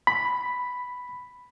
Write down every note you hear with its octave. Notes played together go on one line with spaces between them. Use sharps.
B5